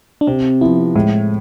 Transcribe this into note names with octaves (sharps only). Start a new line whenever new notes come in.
D4
C3 C4
F3 B3 E4
A2 G#3